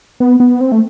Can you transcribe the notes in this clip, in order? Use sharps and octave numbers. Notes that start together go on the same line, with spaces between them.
B3
B3
C4
A3